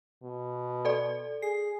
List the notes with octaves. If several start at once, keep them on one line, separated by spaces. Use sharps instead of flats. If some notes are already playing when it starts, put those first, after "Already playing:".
B2
A4 D5
G#4 C7